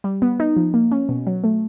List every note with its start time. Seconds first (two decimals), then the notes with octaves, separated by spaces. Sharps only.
0.04 G3
0.22 B3
0.40 D#4
0.57 F3
0.74 A#3
0.91 C#4
1.09 B2
1.27 F#3
1.44 A3